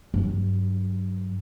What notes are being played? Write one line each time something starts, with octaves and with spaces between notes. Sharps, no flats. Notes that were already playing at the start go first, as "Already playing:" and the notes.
G2 F#3